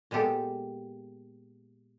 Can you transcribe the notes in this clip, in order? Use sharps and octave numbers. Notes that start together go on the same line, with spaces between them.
A#2 G#3 B3 G4 A4